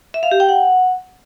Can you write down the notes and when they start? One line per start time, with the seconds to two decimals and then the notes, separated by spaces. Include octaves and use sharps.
0.14 E5
0.23 F5
0.31 G4
0.40 G5
0.49 F#5